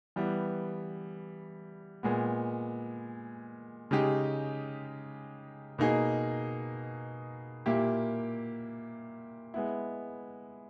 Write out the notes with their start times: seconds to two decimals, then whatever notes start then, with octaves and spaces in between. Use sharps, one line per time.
0.16 E3 G3 B3
2.03 A#2 G#3 B3
3.91 C#3 G#3 D#4 G4
5.79 B2 A#3 D#4 G#4
7.66 A#2 A#3 E4 G4
9.54 G#3 B3 E4